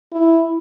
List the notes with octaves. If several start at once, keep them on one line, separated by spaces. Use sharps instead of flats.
E4